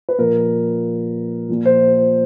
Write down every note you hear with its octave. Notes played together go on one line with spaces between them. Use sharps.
B4
A#2 F3 A#4
A#2 F3
C5